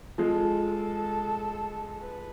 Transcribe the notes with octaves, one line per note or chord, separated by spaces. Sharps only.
F3 G#3 A4
B4